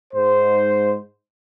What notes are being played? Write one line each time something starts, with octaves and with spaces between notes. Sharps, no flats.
G#2 C5